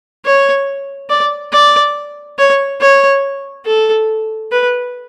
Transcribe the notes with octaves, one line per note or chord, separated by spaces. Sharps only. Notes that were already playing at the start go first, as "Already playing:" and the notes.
C#5
D5
D5
C#5
C#5
A4
B4